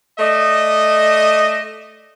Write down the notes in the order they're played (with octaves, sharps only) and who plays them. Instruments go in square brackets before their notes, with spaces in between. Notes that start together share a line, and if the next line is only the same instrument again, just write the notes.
[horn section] A3 D5 D#5